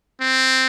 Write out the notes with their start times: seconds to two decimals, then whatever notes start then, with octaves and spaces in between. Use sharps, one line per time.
0.21 C4